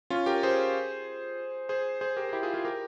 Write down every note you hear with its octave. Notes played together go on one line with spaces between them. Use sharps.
C#4 F4
G4 A#4
G#4 C5
G#4 C5
G#4 C5
G4 A#4
G#4
E4 G4
F4 G#4
F4 G#4
G4 A#4